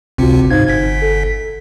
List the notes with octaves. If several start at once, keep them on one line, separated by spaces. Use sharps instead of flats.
G#1 C#2 C3 C4 F4 F#4
G#2 D#4 C5 F5 G#6
G1 B6
A4